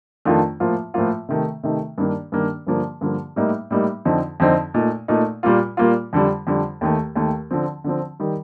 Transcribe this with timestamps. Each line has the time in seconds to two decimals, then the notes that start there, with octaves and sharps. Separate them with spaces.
0.25 F2 D#3 A3 D4 F4
0.60 A2 F3 A#3 F4
0.94 A2 F3 A#3 F4
1.29 C3 D#3 A3 D#4
1.63 C3 D#3 A3 D#4
1.98 G2 D#3 A#3 D4
2.32 G2 D#3 A#3 D4
2.67 G2 D3 F3 A#3
3.01 G2 D3 F3 A#3
3.36 A2 G3 A#3 D#4
3.71 A2 G3 A#3 D#4
4.05 F2 D3 F3 C4 D#4
4.40 F2 D3 F3 C4 D#4
4.74 A#2 A3 D#4
5.08 A#2 A3 D#4
5.43 A#2 G3 A#3 F4
5.77 A#2 G3 A#3 F4
6.13 F2 D3 G3
6.47 F2 D3 G3
6.81 D#2 D#3 A3
7.16 D#2 D#3 A3
7.51 D3 F3 C4
7.84 D3 F3 C4
8.20 D#3 G3